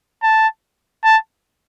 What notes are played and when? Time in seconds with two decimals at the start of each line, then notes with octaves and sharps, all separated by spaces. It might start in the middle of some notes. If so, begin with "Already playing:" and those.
0.23 A5
1.04 A5